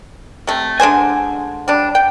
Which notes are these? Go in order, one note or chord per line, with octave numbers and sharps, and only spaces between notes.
C3 A3
D3 G#3 C5 G#5
G3 D4
G5